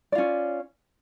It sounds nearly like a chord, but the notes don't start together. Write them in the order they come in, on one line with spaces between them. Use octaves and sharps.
D5 F4 C#4